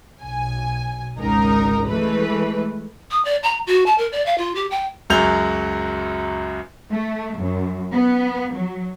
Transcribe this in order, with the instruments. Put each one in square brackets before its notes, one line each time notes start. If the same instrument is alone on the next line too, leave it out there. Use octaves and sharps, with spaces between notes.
[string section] B1 G#5
G#1 C#2 D#4 A#4 A#5
E3 G#3 A3 B4
[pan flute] D#6
D5
A#5
F#4
A5
A#4
D5
F5
F4
G4
G5
[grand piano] C#2 F#2 F#3 G6 F7
[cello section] A3
F#2
B3
F#3